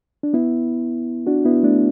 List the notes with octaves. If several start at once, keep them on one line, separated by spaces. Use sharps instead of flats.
D4
B3 E4
D4 F#4
B3 E4
A3 D4